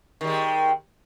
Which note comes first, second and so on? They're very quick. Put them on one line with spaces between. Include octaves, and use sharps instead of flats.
D#3 G3 G#3